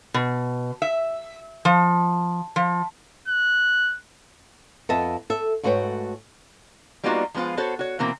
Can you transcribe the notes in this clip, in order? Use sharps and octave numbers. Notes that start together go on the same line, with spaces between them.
B2
E5
F3
F3
F#6
F2 B3 D#5 E5 A5
A4 E5
G#2 A3 F#4 B4 C#5 G5
G3 A#3 B3 D#4 F4 F#4
F3 G#3 B3 F4 C5
B3 F#4 A4 C5 C#5
F#4 C#5
B2 E3 A#3 C4